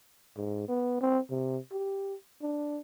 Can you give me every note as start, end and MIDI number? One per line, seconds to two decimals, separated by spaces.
0.37 0.66 44
0.68 0.99 59
1.01 1.19 60
1.30 1.58 48
1.72 2.15 67
2.42 2.80 62